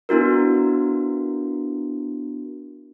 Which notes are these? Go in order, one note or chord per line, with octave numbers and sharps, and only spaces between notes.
B3 D4 E4 F#4 A#4